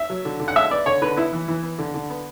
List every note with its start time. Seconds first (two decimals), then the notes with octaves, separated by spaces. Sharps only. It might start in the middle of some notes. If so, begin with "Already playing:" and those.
Already playing: E5
0.10 F#3
0.25 D3
0.40 D3
0.48 F#5
0.56 G#3 E5
0.70 B3 D5
0.86 D3 C#5
1.02 D3 B4
1.17 B3 E4
1.33 E3
1.48 E3
1.63 B3
1.79 D3
1.94 D3
2.10 B3